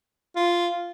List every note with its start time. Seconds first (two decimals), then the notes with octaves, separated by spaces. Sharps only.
0.35 F4